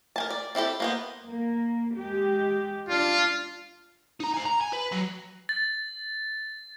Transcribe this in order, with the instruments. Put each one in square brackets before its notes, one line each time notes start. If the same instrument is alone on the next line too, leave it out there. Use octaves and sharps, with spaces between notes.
[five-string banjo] A#4 G#5 A5
D5
C4 E4 G4 A4
A#3 B3 C5
[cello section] A#3
G#3 G4
[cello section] D4 [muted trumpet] F4
[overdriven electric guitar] D#4 A#5
C5 G#5
A#5
G#5
B4
F#3
[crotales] A6